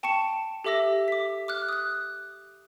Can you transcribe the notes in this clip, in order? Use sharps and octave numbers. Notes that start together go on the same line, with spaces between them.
G5 A5 C#6 C#7 E7
G4 A4 E5 D6 E6 A#6
D6 B6
D6 F6 F#6
D#6 F#6